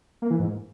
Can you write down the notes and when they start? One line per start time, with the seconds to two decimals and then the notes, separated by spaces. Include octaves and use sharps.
0.22 A#3
0.30 E3
0.39 G#2